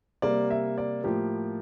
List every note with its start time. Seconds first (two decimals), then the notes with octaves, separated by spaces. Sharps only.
0.22 C3 G3 A#3 D5
0.50 E5
0.78 D5
1.04 A2 F3 A#3 G4